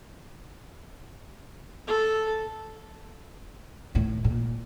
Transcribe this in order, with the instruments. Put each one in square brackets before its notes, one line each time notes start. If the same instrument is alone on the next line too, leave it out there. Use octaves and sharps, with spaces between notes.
[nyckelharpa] A4
[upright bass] D#2 A2
A#2